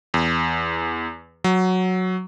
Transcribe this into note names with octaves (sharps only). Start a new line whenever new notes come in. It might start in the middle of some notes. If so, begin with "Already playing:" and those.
E2
F#3